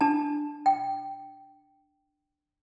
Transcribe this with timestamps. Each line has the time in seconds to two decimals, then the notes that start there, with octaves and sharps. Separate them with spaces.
0.01 D4 A5
0.66 G5